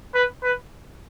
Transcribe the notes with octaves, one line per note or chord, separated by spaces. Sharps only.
B4
B4